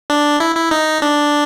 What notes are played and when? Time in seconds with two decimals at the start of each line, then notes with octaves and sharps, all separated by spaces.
0.10 D4
0.40 E4
0.56 E4
0.71 D#4
1.02 D4